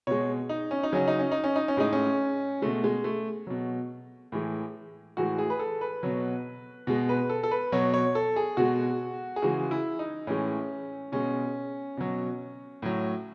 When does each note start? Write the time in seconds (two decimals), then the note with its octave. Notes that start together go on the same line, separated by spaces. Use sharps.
0.07 B2 G#3 C#5
0.49 D#4
0.71 C#4
0.83 D#4
0.92 C#3 F#3 C#4
1.08 D#4
1.19 C#4
1.32 D#4
1.44 C#4
1.56 D#4
1.68 C#4
1.77 A2 G#3 D#4
1.93 C#4
2.62 B2 G#3 A3
2.84 G#3
3.04 A3
3.47 B2 F#3
4.32 A2 E3 G#3
5.17 A2 E3 G#3 F#4
5.39 G#4
5.50 B4
5.59 A4
5.81 B4
6.03 B2 F#3
6.87 B2 G#3
7.09 B4
7.29 A4
7.43 A4
7.51 B4
7.72 B2 F#3 C#5
7.94 C#5
8.15 A4
8.36 G#4
8.57 B2 G#3 F#4
9.36 G#4
9.42 C#3 E3 G#3 F#4
9.71 E4
9.99 D#4
10.27 A2 E3 G#3 C#4
11.12 B2 G#3 C#4
11.97 B2 F#3
12.82 A2 F#3